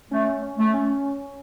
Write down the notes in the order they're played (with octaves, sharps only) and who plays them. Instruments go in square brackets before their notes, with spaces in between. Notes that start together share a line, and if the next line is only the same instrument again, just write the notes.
[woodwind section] A3 [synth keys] C#4
[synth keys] C#4
[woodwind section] A3
[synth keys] C#4